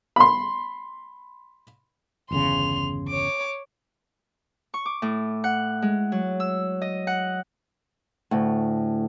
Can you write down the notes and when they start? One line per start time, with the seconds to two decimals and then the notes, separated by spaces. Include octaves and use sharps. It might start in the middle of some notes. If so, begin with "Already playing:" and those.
0.16 B5 C6
2.31 G1 E2 C#3 C6 F7
3.09 C#5 D6
4.74 C#6
4.85 D6
5.02 A2
5.44 F#5
5.82 G#3
6.12 F#3
6.40 E6
6.82 D#5
7.07 F#5
8.31 D2 A2